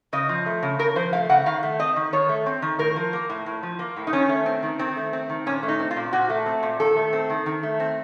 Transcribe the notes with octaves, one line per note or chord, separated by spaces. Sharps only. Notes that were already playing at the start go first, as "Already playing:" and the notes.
C#3 D#5
F3
A3
C#3
C#3 A#4
F3 C5
A3 F5
C#3 F#5
D#3 F5
A3
C4 D#5
D#3
D#3 C#5
A3
C4
D#3
A2 A#4
F3
A#3
A2
A2
F3
A#3
A2
D#4
D#3 C#4
A3
C4
D#3
D#3 C4
A3
C4
D#3
A#2 C#4
A3
D#4
C4
F4
A#2
A#2 F#4
A3
C4
A#2
D#3 A4
A3
C4
D#3
D#3
A3
C4